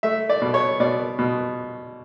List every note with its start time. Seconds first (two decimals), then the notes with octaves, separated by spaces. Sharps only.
0.03 A3 E5
0.29 D5
0.42 B2
0.54 C#5
0.80 B2 D5
1.19 B2